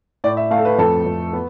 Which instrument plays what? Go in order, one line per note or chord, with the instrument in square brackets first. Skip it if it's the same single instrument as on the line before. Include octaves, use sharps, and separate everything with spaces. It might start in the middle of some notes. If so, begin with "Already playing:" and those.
[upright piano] A2 D5
E5
A3 F5
A4
B4
F2 A4
F2
B3